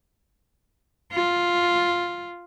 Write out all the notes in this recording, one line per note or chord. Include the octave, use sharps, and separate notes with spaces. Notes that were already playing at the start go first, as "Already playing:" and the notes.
F4